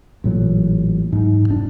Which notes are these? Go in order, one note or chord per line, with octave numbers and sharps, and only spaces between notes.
A1 A#2 F#3
G#2
F1 D4